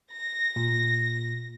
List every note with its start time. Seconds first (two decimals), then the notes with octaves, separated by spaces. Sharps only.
0.12 A#6
0.56 A#2